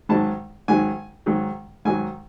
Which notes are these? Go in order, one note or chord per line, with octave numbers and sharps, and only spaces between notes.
G#2 D#3 F#3 A5
G#2 D#3 F#3 G#5
G#2 D#3 F#3
G#2 D#3 F#3 G#5